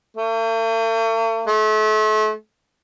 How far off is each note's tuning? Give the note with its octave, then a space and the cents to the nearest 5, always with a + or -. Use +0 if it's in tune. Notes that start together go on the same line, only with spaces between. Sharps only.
A3 +45
A3 -35